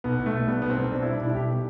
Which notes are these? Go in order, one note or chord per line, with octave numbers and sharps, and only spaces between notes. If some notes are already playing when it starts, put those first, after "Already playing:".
B1 B3
B1
A3
B2
G3 B3
B1 B3
C4
B1
B2 D4
G3 E4
D4
B1 E4
B1 G4
B2